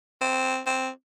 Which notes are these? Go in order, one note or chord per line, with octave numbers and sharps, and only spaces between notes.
C4
C4